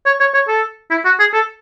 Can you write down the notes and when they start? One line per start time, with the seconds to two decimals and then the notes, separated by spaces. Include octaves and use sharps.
0.06 C#5
0.20 C#5
0.34 C#5
0.48 A4
0.91 E4
1.05 F#4
1.20 G#4
1.33 A4